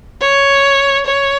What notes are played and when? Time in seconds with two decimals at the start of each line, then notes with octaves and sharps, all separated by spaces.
0.20 C#5
1.06 C#5